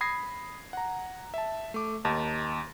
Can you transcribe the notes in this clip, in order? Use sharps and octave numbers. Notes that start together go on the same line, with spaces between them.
B5 D#6 G#6 A#6 C7
F#5 A#5
E5 A5
A3 D6
D#2 D#4 A5